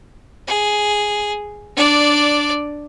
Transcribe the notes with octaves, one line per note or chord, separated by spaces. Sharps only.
G#4
D4 D5